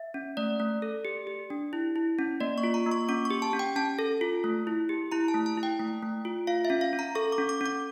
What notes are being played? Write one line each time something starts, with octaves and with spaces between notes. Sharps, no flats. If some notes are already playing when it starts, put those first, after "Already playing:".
Already playing: E5
C#4
A3 D5
A3
A4
G4
G4
D4
E4
E4
C#4
A#3 D5
C#6
F4
A#5
A#3
C#6
C#4 D6
C#6
G4
A5
C#4
G5
C#4 A5
A4
F4
A3
E4
G4
E4 A#5
A5
A3
A5
E4
G5
A3
A3
F4
F4 F5
E5
C#4
F5
C#4
A#5
A4 C#6
D6
C#4
D6
C#4 D6